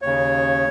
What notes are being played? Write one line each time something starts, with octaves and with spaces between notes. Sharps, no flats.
D#2 C#3 C#5